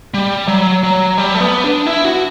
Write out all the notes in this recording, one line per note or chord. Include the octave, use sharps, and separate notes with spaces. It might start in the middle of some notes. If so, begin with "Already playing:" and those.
G3
F#3
F#3
G3
A3
B3
D4
E4
F#4